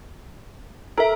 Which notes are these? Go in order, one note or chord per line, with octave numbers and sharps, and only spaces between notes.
A4 A#4 E5